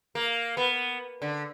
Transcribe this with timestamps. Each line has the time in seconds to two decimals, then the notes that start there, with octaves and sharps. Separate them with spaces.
0.15 A#3
0.57 B3
1.22 D3